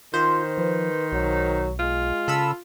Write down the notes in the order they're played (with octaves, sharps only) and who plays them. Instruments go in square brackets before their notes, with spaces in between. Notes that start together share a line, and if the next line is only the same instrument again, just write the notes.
[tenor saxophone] D#3 [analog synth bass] F4 [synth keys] C5
[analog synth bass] F3 [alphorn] B4
[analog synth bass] B1 [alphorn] F#3
[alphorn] G#3 [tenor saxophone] F4
[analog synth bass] C#3 [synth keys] A4 B5 E6